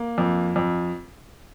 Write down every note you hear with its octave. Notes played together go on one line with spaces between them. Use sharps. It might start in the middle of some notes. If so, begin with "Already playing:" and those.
Already playing: A#3
F2
F2